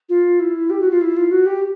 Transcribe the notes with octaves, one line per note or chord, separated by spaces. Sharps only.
F4
E4
G4
F#4
F4
E4
F4
F#4
G4